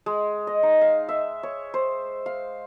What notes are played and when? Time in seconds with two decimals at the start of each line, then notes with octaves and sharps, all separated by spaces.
0.06 G#3
0.47 D#5
0.63 D#4
0.81 F5
1.09 E5
1.43 C#5
1.74 C5
2.26 F5